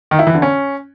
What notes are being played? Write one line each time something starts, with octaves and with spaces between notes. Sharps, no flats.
D#3
E4
E3
D3
C#4